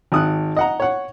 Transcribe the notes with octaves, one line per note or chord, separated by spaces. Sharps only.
G#1 D#6 F#6
D#5 F#5 A#5
C#5 F#5